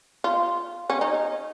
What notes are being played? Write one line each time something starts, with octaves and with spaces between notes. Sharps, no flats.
F4
C#4
D#4